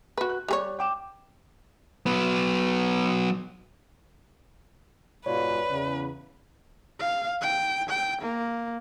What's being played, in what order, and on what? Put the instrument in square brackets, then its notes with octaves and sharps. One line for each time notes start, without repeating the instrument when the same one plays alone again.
[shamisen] F#4 B4
[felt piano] F#6
[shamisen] G3 G#4 C#5 [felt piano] G4 D5
[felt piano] G5 D6 E7
[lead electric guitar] F#3 B3
[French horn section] G#2 B2 F4 [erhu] B4 [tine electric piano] C#5 D5
[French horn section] E2 C#3
[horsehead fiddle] F5
G5
G5
A#3